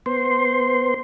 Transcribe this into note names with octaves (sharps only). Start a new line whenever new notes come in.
B3 C5 C6